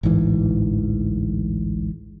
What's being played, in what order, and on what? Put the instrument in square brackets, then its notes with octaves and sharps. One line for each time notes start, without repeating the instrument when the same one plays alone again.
[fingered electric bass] A1 D2 G#2 E3